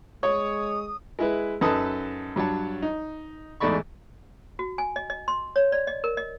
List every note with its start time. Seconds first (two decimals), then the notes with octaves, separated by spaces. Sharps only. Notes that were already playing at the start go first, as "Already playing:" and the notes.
0.23 G#3 C#5 C#6 D#6
1.19 G#3 E4 B4
1.61 F#2 D#4 A4 B4 A5 D#6
2.36 G2 F#3 C#5 A5
2.82 D#4
3.60 E2 G#2 A3 D5 B5 C#6
4.59 F#4
4.78 G#5
4.96 D#5
5.10 D#5
5.28 C6
5.56 C#5
5.72 D5
5.87 D#5
6.04 A#4
6.17 D#5